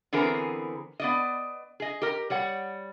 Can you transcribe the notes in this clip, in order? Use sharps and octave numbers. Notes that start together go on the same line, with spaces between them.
D3 E3 B3 C4 G#4 A#4
B3 D5 D#5
G#4 D#5
G4 A#4
G3 C#5 F#5